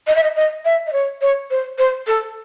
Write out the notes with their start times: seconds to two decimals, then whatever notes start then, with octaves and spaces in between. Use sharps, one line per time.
0.07 D#5
0.16 E5
0.23 D#5
0.36 D#5
0.65 E5
0.87 D#5
0.93 C#5
1.22 C#5
1.51 C5
1.78 C5
2.07 A4